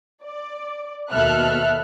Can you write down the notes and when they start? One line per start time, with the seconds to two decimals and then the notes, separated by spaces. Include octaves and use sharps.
0.24 D5
1.10 D#2 B2 A4 E5 F6 F#6